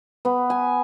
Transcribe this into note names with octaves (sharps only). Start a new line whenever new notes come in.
B3
G#5